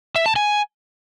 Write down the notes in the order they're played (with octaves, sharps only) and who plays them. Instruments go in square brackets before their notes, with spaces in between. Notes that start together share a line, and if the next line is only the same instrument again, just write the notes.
[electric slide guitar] E5
A5
G#5